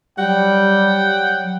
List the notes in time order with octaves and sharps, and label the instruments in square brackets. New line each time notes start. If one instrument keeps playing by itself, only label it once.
[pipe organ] F#3 [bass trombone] G3 [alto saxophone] F#5 [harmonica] G5